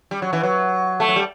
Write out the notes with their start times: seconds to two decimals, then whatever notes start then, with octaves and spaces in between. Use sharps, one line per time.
0.11 G3
0.22 F#3
0.33 E3
0.43 F#3
1.00 A3
1.08 F#3
1.16 G3